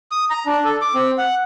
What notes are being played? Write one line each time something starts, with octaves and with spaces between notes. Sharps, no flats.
D#6
A#5
D4
A4
D6
C4
F#5